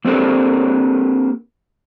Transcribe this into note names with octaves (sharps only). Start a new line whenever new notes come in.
A#3 C4 D4 G4 A4 A#4